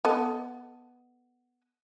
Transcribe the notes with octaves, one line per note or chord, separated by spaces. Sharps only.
B3 A4 D#5